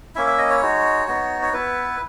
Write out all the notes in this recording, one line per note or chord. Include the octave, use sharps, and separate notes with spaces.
A#3 C#4 E4 E5
E5
D#5
C#5
G#3 D#4 F#4
B3 D#4 F#4
C#5
B3 E4 B4